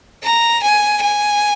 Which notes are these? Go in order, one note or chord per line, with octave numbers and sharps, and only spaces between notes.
A#5
G#5
G#5